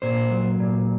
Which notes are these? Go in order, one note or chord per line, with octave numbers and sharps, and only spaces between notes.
A#2 C5
F#3
A#2